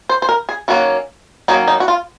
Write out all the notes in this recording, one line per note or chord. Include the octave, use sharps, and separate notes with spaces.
C5
C5
A#4
G#4
D#3 F#3 A#3 C#4 F#4
D#3 F#3 A#3 C#4 D#4
D#4
F#4
F4